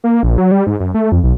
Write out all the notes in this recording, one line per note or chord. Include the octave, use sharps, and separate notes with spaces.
A#3
A#1
F#3
G3
G#2
F#2
A3
F2
B1